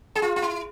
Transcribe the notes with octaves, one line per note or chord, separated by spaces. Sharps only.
G#4
F4
F4
E4